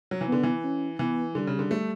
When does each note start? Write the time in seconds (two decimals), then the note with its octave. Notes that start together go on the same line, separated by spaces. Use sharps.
0.11 F#3
0.21 E3
0.28 D3 B3
0.43 E3
0.64 C#4
0.99 E3 B3
1.35 D3 G3
1.47 C#3
1.59 D3
1.71 A3